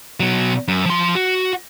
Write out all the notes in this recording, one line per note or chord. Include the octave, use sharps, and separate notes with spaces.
B2 F#3
F#2
F3 C6
F#4